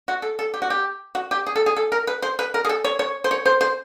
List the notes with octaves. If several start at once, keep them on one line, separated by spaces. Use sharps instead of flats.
F#4
A4
A4
G4
F#4
G4
F#4
G4
G#4
A4
G#4
A4
A#4
B4
C5
B4
A#4
G#4
A4
C#5
C#5
C5
C#5
C5
C5